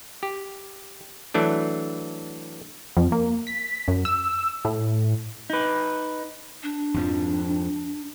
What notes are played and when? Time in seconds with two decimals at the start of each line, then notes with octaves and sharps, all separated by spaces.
0.23 G4
1.34 E3 F#3 A3 D4
2.97 F2
3.12 A#3
3.47 B6
3.88 F#2
4.05 E6
4.65 A2
5.50 D#4 B4
6.63 D4
6.94 F2 G#2 F3